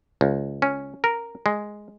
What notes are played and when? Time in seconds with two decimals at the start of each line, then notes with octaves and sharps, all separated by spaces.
0.21 C#2
0.62 C#4
1.04 A#4
1.46 G#3